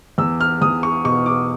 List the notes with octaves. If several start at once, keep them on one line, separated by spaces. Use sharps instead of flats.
E2 E6
F6
E2 D#6
C#6
B2 C#6
D6